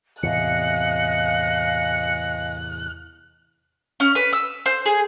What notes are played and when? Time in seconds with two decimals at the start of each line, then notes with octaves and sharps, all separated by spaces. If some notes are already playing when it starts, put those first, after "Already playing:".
0.23 E2 A2 C3 D#5 F5 G#5 F#6 C#7
4.00 C#4
4.15 B4
4.33 E6
4.66 C5
4.86 G#4